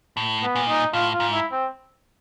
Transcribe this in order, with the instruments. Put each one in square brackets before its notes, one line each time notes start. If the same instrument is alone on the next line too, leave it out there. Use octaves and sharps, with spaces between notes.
[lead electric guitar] A2
[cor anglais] B3
[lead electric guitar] A#2
[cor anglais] D#4
[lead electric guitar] A2 [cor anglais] F4
[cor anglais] F4
[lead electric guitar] G#2
[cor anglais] E4
C4